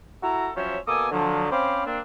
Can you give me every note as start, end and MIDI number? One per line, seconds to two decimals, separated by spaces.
0.23 0.50 64
0.23 0.50 66
0.23 0.50 69
0.23 0.50 82
0.57 0.79 53
0.57 0.79 54
0.57 0.79 61
0.57 0.79 72
0.57 0.79 73
0.57 0.79 76
0.88 1.07 47
0.88 1.07 58
0.88 1.07 69
0.88 1.07 80
0.88 1.07 86
0.88 1.07 87
1.12 1.49 50
1.12 1.49 53
1.12 1.49 54
1.51 1.82 60
1.51 1.82 61
1.51 1.82 72
1.51 1.82 77
1.51 1.82 83
1.51 1.82 86
1.87 2.00 58
1.87 2.00 60
1.87 2.00 62